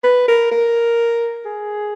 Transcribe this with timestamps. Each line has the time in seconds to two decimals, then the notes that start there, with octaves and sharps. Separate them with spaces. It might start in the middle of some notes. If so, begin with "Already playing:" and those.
0.04 B4
0.28 A#4
0.51 A#4
1.45 G#4